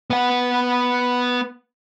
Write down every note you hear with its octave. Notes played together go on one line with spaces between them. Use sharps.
B3 F#5